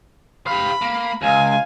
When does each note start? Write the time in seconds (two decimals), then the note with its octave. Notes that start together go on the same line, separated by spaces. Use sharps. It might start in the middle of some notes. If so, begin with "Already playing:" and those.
0.47 G4 F5 B5
0.82 A#3
1.22 C#2 F5 G#5